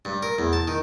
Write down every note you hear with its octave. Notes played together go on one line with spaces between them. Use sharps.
G2
A#4
E2
A5
D#3